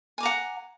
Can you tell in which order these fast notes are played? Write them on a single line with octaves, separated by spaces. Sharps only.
G#5 D6 A#5 F#5